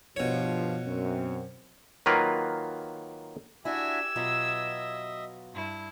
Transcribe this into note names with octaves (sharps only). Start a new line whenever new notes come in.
G2 B2 F3 C#5
F#2 C4
D#3 F#3 A#3 F4 A#4 B4
D4 E4 F#4 G4 E5 G#5 E6 G#6
B2 F#3 F4 D#5 E5
G2 E4